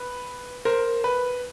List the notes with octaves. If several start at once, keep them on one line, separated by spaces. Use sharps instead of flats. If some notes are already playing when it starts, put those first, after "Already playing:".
Already playing: B4
A#4 C5
B4